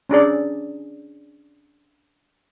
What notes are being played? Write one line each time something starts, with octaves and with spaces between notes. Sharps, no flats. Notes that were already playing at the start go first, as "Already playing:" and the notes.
C#4 D4 G#4 D5